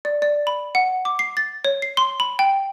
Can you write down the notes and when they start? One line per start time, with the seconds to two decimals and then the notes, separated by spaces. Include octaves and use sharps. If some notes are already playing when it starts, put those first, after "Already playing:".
0.05 D5
0.22 D5
0.47 B5
0.75 F#5
1.05 D6
1.19 C7
1.37 A6
1.65 C#5
1.82 C7
1.97 C6
2.20 B5
2.39 G5